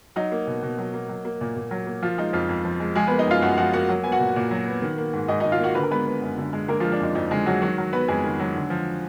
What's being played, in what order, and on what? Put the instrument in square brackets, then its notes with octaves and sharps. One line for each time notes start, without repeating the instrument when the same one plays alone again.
[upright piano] F#3 D#4
A#3
B2
B2
F#3
A#3
F#3
A#3
A#2
A#2
F#3
A#3
F3 F4
G#3 D#4
F2 F3 F4
F2
F3
G#3
F3 G#3 G#4
A#3 B3 B4
D#4 D#5
F#2 F4 F5
F#2 F#4 F#5
F3 F#4 F#5
A#3 F#4 F#5
F#3
B3 G#5
F#4 F#5
A#2
A#2
F#3
B3
D#3
A#3
G#2
G#2 D#4 D#5
D#4 D#5
D#3
F4 F5
A#3 F#4 F#5
D3 B4
A#4
G#3 B3 B4
B3
F#2
D3
G#3
D3 A#3 A#4
F3 F4
G#3
D4
F2 D#4
F2 D#4
D3 G#3 G#4
F#3 G#3 F#4
D#3 F#3 F#4
F#3
B3 B4
F2 G#3 G#4
D#3
F#3
D3
F3